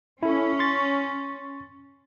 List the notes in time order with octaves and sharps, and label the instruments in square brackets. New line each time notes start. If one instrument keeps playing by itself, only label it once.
[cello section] C#4 [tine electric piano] E4 A4
[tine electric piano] C6 C#6 A6